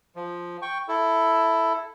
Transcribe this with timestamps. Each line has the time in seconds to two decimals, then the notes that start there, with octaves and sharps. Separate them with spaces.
0.16 F3
0.62 G5 C#6
0.88 E4 A4